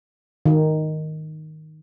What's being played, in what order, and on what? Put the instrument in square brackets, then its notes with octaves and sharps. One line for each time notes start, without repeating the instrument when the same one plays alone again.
[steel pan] D#3